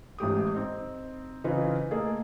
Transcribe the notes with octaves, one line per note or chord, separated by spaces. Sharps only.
A1 G#2 G4 D#6
C4 D#4
C#3 E3 D#4 F4 B4 C5
A3 A#3 G#4 A4 D#5